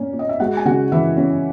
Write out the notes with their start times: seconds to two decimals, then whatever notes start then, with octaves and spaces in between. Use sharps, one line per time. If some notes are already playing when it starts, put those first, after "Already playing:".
Already playing: A#2 A#3 C#4
0.13 A#2
0.19 D#5
0.29 E5
0.40 G#3 F#4 F#5
0.57 G#5
0.65 C#3 F#4 F#5
0.92 E3 E4 E5
1.17 C#4